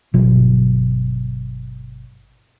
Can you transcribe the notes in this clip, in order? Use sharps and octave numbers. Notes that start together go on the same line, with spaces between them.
G1 B2 F#3